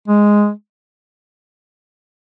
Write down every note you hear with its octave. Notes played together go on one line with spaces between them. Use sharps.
G#3